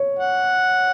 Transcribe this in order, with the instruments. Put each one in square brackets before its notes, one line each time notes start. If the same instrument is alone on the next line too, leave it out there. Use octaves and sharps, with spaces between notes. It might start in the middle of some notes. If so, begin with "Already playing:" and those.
Already playing: [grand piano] C#5
[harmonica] F#5